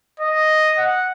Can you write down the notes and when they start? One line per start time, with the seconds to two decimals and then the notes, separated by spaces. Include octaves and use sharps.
0.19 D#5
0.78 F#5